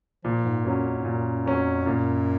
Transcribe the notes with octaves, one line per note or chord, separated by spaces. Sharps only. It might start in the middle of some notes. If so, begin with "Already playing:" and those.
A#2 F3
G#2
F#2 F#3 C#4
F2
G#2
F#2 A#2
F2 F#3 C#4
F#2 A#2